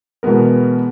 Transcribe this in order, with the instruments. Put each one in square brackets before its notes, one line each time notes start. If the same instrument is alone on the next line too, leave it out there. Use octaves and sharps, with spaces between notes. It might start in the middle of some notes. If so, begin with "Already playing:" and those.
[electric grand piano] B2 E3 G#3 B3 A#4